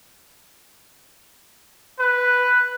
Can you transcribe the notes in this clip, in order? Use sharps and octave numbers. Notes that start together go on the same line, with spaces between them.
B4